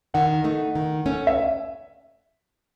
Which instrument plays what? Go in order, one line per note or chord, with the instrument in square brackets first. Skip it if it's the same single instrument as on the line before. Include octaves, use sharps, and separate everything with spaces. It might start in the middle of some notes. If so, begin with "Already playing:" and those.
[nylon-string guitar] D#3 [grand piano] F#5
[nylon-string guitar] A3 D#4
D#3
A3 C#4
[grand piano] E5